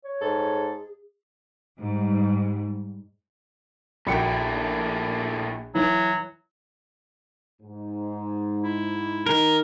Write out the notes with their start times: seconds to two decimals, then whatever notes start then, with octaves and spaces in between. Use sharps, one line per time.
0.05 C#5
0.21 G#2 G#4 A4
1.79 G#2 G3
4.07 A#1 A3 A#3 E4 F#4 G5 B5 C#7
5.75 E3 F#3
7.61 G#2
8.64 E4
9.26 D#3 A#4